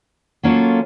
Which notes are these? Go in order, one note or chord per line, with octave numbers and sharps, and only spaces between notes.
F#3 A#3 C#4 F4 A4